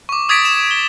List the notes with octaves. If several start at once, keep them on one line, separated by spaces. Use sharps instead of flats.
C#6 D6
C#6 D#6 G#6 A6 B6 D7
E7
G7